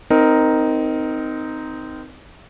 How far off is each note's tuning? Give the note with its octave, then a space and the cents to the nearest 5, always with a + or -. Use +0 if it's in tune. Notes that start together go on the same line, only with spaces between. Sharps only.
C4 -20 D#4 +0 A#4 +0